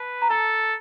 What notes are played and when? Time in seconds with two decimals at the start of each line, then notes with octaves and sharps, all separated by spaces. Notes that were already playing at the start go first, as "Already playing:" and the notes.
Already playing: B4 A5
0.22 A#5
0.30 A4 A5